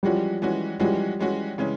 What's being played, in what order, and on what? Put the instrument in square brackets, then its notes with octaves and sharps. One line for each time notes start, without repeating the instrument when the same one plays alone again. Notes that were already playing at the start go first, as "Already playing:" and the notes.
[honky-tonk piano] E3 G#3 C#4 F#4 [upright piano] F3 G3
[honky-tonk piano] E3 G#3 C#4 F#4
[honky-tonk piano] E3 G#3 C#4 F#4 [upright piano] F3 G3
[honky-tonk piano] E3 G#3 C#4 F#4
C#3 E3 G#3 C#4